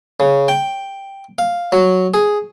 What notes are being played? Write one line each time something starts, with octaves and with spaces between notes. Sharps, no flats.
C#3
G5
F5
F#3
G#4